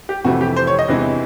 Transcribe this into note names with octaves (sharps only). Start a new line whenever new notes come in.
G4
F2 C3 E3 A3 F#4
G4
C5
C#5
D#5
E2 C3 E3 G#3